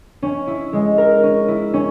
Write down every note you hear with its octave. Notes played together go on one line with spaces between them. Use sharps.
C#4
E4
G#3
A#4
C#4
E4
C#4